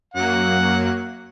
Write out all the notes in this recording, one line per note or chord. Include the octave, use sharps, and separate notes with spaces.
F#2 F#3 A#3 F#5